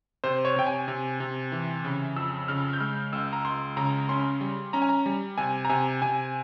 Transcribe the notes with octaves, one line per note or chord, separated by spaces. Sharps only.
C3 C5
C#5
C3 G5
G#5
C3
C3
E3
C#3
F2 E6
C#3 F6
G6
G#3 F6
C#2 E6
A#5
C#2 C6
C#3 A#5
C#4 C6
G3
C#4 A#5
G#5
A#5
G3
C3 G#5
A#5
C3 G#5
C3 G#5